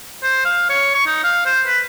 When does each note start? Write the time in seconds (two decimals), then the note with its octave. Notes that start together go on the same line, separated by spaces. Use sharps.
0.23 C5
0.45 F5
0.69 C#5
0.95 C#6
1.06 D#4
1.24 F5
1.46 C5
1.67 B4